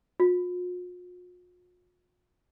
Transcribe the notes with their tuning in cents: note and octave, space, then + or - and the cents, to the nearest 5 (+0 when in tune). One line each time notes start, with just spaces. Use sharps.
F4 +45